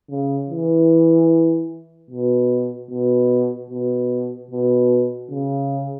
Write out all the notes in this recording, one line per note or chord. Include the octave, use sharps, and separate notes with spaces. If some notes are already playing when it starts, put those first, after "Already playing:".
C#3
E3
B2
B2
B2
B2
C#3